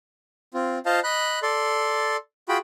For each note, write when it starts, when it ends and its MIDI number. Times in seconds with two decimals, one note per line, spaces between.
0.54 0.78 60
0.54 0.78 65
0.86 1.00 65
0.86 1.00 72
0.86 1.00 75
0.86 1.00 77
0.86 1.00 81
1.04 1.39 75
1.04 1.39 83
1.04 1.39 90
1.43 2.17 69
1.43 2.17 74
1.43 2.17 84
2.49 2.58 65
2.49 2.58 66
2.49 2.58 68
2.49 2.58 79
2.49 2.58 83